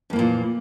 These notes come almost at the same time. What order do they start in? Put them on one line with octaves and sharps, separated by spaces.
F2 A#3 E3 A#2